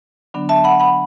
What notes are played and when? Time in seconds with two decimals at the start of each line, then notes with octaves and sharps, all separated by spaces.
0.34 D3 F#3 B3 D4
0.49 E5 A5
0.64 F#5 B5
0.80 F#5 B5